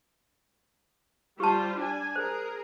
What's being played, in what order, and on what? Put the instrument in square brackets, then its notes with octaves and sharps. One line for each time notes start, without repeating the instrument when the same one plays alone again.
[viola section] G3 F4 C5 [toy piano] G4 A5
[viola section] D4 G#5
[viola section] G#4 A#4 [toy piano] C5